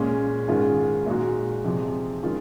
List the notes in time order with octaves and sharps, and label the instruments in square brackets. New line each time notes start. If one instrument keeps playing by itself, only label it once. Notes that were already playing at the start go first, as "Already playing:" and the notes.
Already playing: [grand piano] A#2 G#3 C#4
G#2 D#3 G#3 C#4 F4
A#2 G#3 D#4 F#4
F2 C3 F3 G#3
D#3 G#3 C#4 F4